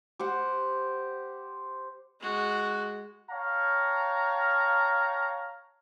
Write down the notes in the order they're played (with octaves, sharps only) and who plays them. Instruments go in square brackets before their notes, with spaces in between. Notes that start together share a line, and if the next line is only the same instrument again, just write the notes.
[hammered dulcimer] G4 C5 F#5
[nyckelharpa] G#3 F#4
[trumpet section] C#5 F5 G5 A5 A#5